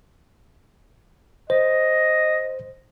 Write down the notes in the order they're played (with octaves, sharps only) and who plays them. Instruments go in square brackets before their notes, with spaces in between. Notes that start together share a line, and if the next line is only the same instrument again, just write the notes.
[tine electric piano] C5 [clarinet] D#5